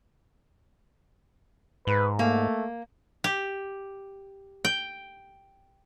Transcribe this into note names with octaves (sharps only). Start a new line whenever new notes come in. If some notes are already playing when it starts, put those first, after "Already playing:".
G#2 B4
A3 A#3
G4
G5